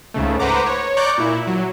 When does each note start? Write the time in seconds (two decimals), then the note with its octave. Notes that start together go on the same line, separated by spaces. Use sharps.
0.14 C#2 G#2 C#3 A3
0.39 B4 C5 F#5 A#5 D6
0.66 C#5
0.97 D5 A#5 C#6 D6 F#6 G6
1.18 A#2 E4
1.47 F#3